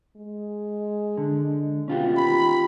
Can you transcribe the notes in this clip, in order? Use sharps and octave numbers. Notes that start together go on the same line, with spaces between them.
G#3
D3
B2 C#4 F4 G4
D#3 B5